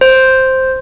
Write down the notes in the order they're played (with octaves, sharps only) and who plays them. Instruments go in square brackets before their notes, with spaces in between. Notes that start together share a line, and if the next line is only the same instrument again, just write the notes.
[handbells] C5